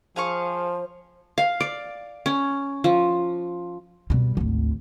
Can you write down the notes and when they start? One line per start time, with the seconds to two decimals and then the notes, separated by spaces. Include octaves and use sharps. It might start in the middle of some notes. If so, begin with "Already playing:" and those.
0.16 F3 G#4 C5 F5 C#6
1.38 F5
1.60 D5
2.26 C#4
2.84 F3
4.10 B2 G3
4.37 G#1 D2